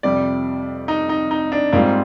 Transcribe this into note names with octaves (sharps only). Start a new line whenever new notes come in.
F2 C3 G3 D5
D#4
D#4
D#4
D4
G#2 G3 A#3 C4 F4